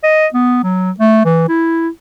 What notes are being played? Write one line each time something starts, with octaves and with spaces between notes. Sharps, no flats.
D#5
B3
F#3
A3
E3
E4